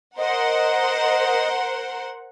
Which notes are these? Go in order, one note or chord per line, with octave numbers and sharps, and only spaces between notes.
A#4 C5 D#5 F#5